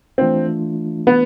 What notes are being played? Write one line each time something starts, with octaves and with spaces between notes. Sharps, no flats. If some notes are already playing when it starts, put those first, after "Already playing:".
E3 A3 C4 D4 F4
B3